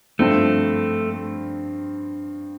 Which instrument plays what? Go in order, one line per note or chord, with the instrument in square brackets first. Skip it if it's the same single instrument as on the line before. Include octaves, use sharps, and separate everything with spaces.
[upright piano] G2 F3 C4 [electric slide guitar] A3